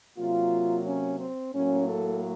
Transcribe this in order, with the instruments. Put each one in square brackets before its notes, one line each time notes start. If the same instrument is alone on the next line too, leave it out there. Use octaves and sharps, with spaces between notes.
[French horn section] C3 F#3 A#3 F4
C#4
C4
A2 F#3 A#3 C#4
A4